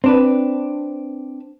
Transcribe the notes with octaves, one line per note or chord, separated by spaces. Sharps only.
C4 D4 B4